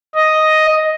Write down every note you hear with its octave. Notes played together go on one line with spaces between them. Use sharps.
D#5